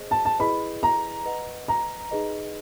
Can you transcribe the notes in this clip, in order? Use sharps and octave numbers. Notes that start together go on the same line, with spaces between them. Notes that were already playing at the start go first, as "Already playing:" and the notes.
Already playing: G#4 C5 D#5
A5
A5
E4 G#4 B4 D#5 B5
A#5
B4 D#5 F#5
A#5
D#4 G#4 B4 D#5